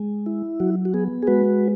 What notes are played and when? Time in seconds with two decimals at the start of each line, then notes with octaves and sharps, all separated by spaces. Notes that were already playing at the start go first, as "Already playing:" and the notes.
Already playing: G#3
0.26 E4
0.60 F#3 F#4
0.85 F#4
0.94 B3 G#4
1.23 G#4
1.27 G#3 F#4 B4